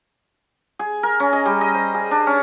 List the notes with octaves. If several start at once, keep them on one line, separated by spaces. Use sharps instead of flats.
G#4
A#4
C#4
D#5
G3
D#5
C5
G#4
D4
C#4